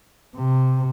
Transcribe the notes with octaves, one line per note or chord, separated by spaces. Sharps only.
C3